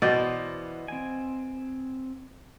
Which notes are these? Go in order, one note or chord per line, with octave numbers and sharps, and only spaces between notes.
B2 E3 B4 C5 D5 G5
C4 G#5